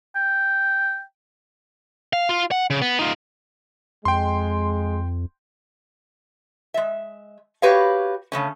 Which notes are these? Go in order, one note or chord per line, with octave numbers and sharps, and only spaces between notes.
G5
F5
F4
F#5
C#3
B3
D#4 F4
F2 G#3 G5 C6
G#3 E5
F#4 G4 B4 C#5 F5
C#3 A3 C#4